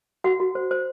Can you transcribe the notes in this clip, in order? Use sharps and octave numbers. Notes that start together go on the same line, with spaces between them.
F#4 F#5
F#4
C5
C5